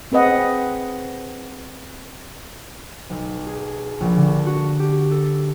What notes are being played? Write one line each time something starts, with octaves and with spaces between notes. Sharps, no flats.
C4 G#4 B4 D#5 F#5
B1
G#4
A#1
D3
A5
F#4
G4
A4